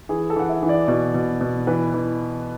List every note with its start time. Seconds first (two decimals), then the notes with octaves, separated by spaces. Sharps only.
0.09 E3 G#4
0.30 A4
0.36 E3 F#5
0.49 E5
0.63 E3
0.69 D5
0.88 B2
1.14 B2
1.41 B2
1.67 E3 B4
1.94 E3